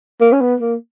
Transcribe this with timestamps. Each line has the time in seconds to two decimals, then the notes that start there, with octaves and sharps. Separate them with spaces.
0.21 A#3
0.32 C#4
0.41 B3
0.60 A#3